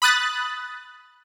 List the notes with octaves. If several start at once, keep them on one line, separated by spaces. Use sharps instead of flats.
B5 D#6 F#6 A6